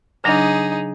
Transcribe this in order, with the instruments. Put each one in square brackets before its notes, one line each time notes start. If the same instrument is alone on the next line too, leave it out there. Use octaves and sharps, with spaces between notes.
[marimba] C#3 F#3 D4 [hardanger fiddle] D#4 G#4